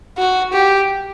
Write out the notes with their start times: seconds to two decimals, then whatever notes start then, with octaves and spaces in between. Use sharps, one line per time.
0.18 F#4
0.53 G4